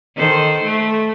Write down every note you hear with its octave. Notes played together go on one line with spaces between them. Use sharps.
D#3 A4 C5
A3